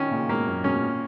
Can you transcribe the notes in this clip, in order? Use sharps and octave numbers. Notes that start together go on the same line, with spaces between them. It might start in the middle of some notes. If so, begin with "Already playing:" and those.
Already playing: D#3 C#4
A#2 C#3
G#2 B2 A#3
F#2 A#2
G#2 B2 C#4
A#2